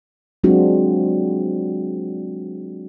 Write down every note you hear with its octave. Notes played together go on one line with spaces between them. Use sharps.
F#3 G#3 C4 D4 F4 F#4